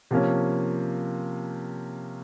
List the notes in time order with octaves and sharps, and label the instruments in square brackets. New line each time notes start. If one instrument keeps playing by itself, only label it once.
[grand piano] C3 F3 A#3 C#4